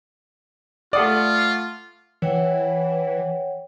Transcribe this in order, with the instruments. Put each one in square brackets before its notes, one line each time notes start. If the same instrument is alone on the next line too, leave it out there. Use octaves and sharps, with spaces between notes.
[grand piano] A3 F#5 D#6 [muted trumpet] F4 [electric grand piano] D5
[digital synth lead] E3 [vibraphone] C#5 F#5 G5